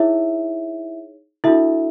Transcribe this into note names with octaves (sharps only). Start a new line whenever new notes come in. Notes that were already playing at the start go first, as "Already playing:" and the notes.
Already playing: D#4 E4 G#4 C#5 E5
D4 E4 F#4 A4 E5